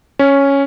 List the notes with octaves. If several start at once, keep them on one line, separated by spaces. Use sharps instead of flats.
C#4